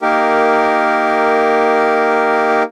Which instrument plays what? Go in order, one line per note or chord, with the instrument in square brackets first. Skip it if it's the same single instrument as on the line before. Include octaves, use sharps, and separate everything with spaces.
[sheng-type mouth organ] A#3 D#4 G4 A#4